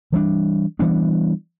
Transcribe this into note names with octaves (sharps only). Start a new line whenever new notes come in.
E3 G3 B3 D4
E3 G3 B3 D4